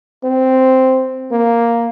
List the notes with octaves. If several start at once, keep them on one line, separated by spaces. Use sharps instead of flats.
C4
A#3